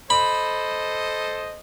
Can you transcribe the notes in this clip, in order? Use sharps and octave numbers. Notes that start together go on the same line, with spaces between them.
A4 C5 D#5 B5